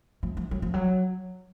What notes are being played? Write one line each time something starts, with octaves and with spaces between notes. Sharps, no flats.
F3
F3
F#3
F3
F#3